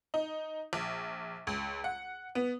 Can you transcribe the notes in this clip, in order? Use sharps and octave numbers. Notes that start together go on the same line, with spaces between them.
D#4
A#1
C#2
F#5
B3